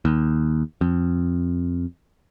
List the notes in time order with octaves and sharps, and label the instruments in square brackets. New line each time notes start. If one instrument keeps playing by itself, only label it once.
[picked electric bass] D#2
F2